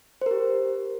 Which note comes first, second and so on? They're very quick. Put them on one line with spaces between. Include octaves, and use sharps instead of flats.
C5 A#4 G4